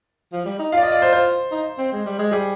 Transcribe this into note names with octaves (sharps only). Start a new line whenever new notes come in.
F3
G3
D#4
F4 D5 F5
D#5
D5
C5
C5
D#4
C4
G#3
G3
G#3
G3 G#4